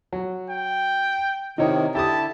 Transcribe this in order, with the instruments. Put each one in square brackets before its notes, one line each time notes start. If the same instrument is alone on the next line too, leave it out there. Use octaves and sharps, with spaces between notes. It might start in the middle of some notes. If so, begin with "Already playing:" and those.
[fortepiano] F#3
[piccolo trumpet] G5
[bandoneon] C3 D#3 [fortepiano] D#4 E4 C#5
[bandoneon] D3 E4 [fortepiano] G4 D#6 [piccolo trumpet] A5